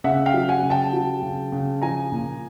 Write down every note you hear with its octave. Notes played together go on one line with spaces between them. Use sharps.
C#3 E5 F#5
F5 G5
F#3
F#5 G#5
C#3
G5 A5
F#3
C#3
C#3
F3 G#5 A#5
A#2